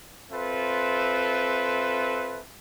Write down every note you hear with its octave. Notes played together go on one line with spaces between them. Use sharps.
C4 F4 A4 B4 E5